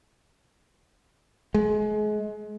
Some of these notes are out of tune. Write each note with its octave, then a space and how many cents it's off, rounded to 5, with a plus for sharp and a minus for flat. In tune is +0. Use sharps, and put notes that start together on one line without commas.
G#3 +30